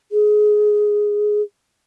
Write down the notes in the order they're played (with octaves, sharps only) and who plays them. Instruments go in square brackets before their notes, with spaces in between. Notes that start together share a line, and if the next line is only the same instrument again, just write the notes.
[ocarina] G#4